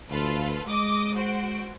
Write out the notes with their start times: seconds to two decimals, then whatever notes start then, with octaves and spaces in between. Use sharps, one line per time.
0.10 D2 F4 A4 B4
0.68 G#3 D#5 D6 D#6
1.15 F#4 C5 D7